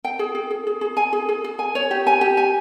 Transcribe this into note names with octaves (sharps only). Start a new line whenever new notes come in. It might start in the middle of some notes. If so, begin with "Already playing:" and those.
G5
G#4
G#4
G#4
G#4
G#4
G#5
G#4
G#4
G#4
G#5
C#5
G4
G#5
G4
G#5